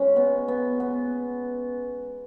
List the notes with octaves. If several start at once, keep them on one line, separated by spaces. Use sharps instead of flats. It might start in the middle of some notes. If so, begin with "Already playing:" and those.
Already playing: G#3 C#4
B3
B3
B3